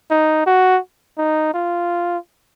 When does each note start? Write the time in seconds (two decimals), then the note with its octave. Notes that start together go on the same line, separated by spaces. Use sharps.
0.11 D#4
0.46 F#4
1.18 D#4
1.54 F4